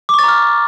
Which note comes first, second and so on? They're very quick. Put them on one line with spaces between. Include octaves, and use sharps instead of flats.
D6 C#6 A6 A#5 F6